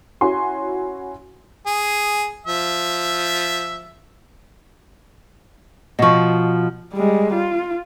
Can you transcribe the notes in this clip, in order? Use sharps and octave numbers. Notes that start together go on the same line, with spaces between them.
C#4 E4 F#4 G#5 C6
G#4
F3 E5
B2 F3 D#5 C#6
G3 G#3
F4